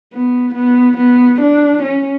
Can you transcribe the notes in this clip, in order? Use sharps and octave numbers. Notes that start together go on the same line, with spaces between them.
B3
B3
B3
D4
C#4